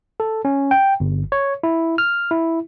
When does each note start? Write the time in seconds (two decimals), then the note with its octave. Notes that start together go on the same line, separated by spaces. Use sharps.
0.20 A4
0.45 C#4
0.71 G5
1.00 G1
1.32 C#5
1.63 E4
1.98 F6
2.31 E4